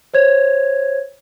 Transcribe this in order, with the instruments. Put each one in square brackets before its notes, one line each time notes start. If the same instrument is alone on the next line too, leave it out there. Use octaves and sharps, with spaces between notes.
[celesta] C5 C#5 G#6